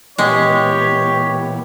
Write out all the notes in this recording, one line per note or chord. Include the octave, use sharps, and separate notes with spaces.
A#2 E3 G#3 B3 G4 C#5